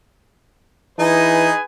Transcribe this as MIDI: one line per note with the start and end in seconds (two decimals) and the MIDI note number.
0.99 1.51 52
0.99 1.54 63
0.99 1.63 68
0.99 1.63 71
0.99 1.63 80